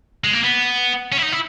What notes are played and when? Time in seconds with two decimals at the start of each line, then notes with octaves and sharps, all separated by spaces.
0.24 G#3
0.33 A#3
0.44 B3
1.12 C#4
1.17 E4
1.22 D#4
1.32 E4